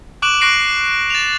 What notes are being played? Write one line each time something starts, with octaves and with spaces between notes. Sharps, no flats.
C#6 D6 F#6 D7 E7 F#7
C#6 F#6 A#6 C7 D7
A6 E7 F7